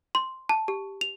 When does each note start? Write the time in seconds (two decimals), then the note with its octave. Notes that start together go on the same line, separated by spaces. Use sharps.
0.15 C6
0.49 A5
0.68 G4
1.01 F7